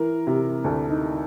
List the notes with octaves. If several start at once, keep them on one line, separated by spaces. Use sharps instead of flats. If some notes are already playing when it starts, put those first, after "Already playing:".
Already playing: E3 A#4
C3
D2 A4
D#4